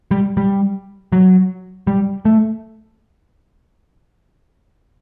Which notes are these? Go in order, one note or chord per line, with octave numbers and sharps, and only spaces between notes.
G3
G3
F#3
G3
A3